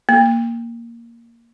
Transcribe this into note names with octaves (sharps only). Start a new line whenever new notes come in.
A#3